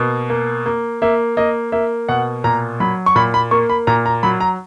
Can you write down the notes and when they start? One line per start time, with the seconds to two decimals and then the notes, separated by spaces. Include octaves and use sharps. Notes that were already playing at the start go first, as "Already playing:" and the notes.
Already playing: B2 A#3
0.29 A#3
0.66 A#3
1.02 A#3 E5
1.37 A#3 D#5
1.72 A#3 E5
2.09 B2 F#5
2.44 A#2 A#5
2.80 F#3 B5
3.06 C#6
3.16 A#2 B5
3.34 B5
3.51 A#3 C#6
3.70 B5
3.87 A#2 A#5
4.06 A#5
4.23 F#3 B5
4.40 A#5